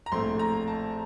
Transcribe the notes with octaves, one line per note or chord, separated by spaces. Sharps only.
A#5
A#1 A2 A3 C4 C6
A#5
A5